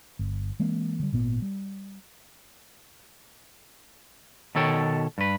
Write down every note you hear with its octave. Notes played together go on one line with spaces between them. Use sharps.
G1
E3 G#3 A#3 C4
D3 G3
G#1 A#2 B3
G3
B2 D#3 A4 C#5 G5
G2 B4